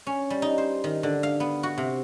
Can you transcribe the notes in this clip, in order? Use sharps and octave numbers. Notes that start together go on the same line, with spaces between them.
C#4
G3
D#4
C5
D#3
D3
F5
B3
F#4
C3